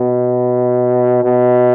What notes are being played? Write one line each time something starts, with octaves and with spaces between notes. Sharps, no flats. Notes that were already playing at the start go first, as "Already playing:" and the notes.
Already playing: B2
B2